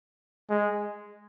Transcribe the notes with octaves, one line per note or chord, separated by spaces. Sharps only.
G#3